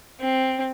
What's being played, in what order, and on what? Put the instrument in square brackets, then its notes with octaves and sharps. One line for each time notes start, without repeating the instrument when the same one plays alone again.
[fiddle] C4